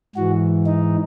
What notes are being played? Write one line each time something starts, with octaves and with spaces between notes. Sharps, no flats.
G#2 E3 F#4
D#4